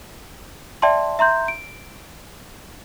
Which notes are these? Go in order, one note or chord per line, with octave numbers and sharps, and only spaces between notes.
D5 E5 G5 A5 C6
E5 A#5 C6 G6
D7